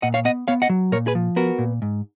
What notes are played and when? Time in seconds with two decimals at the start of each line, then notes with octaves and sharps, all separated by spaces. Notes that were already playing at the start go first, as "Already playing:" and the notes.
0.02 A#2 D#5 F#5
0.14 C#5 F5
0.25 B3 D#5 F#5
0.48 B3 C#5 F5
0.62 D#5 F#5
0.69 F#3
0.92 A#2 A#4 C#5
1.07 G#4 B4
1.15 F3
1.36 B3 F#4 A#4
1.59 A#2
1.82 G#2